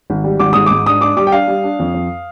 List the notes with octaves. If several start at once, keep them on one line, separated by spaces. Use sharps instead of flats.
G#1
G3
G#1 D6
G#2 D#6
G#2 D6
D4 D#6
D4 D6
G3 D6
G5
D4 F5
G3
D4
F2
F2